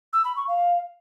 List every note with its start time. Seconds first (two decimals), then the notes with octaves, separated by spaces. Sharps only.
0.13 E6
0.25 B5
0.36 C#6
0.48 F5